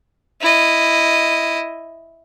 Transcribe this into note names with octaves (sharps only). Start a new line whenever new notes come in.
E4 D#5